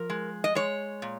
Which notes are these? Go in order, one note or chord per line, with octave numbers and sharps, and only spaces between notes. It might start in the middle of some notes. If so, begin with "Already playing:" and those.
Already playing: F3 A#4
G#3
D#5
G#3 C#5
A#2